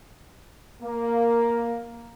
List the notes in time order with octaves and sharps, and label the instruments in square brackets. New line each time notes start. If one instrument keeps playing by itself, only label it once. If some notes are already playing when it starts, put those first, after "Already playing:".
[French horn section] A#3